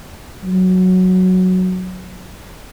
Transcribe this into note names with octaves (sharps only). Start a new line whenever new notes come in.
F#3